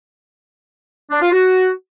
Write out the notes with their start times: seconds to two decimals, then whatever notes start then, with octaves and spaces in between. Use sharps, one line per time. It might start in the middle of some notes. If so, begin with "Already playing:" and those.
1.11 D4
1.21 F4
1.32 F#4